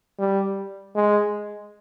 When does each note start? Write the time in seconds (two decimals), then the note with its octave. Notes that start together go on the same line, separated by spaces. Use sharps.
0.19 G3
0.95 G#3